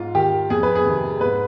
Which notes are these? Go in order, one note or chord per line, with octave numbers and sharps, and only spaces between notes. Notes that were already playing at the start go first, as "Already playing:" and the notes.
Already playing: G#2 F4
D#3 G4
F2 G#4
B4
G#4
C3 D#3
G#2 B4